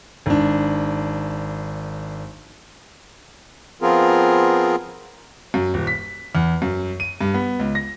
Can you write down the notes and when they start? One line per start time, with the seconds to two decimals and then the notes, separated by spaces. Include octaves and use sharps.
0.26 G#1 D4
3.82 F3 B3 C4 F4 G#4 A#4
5.54 F#2
5.74 D#1
5.87 B6
6.35 E2
6.62 F#2
7.00 D#7
7.21 G2
7.34 B3
7.59 C#2
7.75 A#6